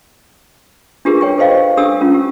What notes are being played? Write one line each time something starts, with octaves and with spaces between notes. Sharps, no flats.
D4 F4 G4 G#4 A#4 B4
C#5 G5 C#6
A4 B4 C5 D#5 F5 G5
D4 G4 A4 D#6 E6
C#4 F4
G4